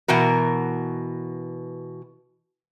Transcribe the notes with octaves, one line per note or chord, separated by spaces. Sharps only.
B2 E3 F#4 A#4